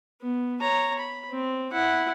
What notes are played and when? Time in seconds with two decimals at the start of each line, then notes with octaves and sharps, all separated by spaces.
0.21 B3
0.61 C#5 A#5
0.99 B5
1.30 C4
1.72 E4 F#5